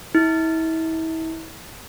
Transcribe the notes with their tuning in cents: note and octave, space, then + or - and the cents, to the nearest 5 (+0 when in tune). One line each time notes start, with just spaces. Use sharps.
E4 -35